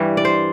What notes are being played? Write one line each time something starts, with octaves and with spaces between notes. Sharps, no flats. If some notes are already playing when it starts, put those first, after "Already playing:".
Already playing: G2 E3 G3
D5
C5